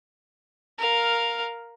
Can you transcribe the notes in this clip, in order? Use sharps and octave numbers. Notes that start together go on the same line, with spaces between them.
A#4 F5